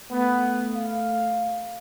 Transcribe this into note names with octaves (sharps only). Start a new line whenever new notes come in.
A3 B3
F5